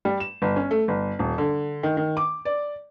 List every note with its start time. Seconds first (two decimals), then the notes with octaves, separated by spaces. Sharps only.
0.05 G3
0.20 E7
0.42 G1
0.56 C#4
0.71 A3
0.88 G1
1.19 D#1
1.38 D3
1.83 D#3
1.97 D#3
2.17 D6
2.45 D5